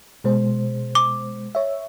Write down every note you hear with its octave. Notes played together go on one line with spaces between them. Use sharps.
B2 G#3 C5
D6
C#5 E5